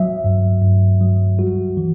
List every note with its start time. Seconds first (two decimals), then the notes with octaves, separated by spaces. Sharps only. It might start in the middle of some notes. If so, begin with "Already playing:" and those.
Already playing: F#3 E5
0.24 G2
0.62 G2
1.01 F#3
1.39 G3 F#4
1.77 E3